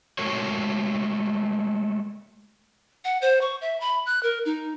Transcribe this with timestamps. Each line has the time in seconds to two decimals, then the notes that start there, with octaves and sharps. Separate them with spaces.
0.18 G#3 A3 F#4 A4 A#4 C#5
3.05 F#5
3.22 C5
3.41 C#6
3.61 E5
3.80 B5
4.06 F#6
4.23 A#4
4.45 D#4